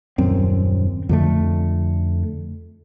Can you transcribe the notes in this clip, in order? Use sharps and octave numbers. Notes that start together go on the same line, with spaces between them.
D#1 F#2 C4
F2 D3 A3